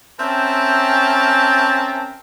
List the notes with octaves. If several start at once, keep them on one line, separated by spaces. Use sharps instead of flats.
C4 C#4 A#4 E5 G5 A5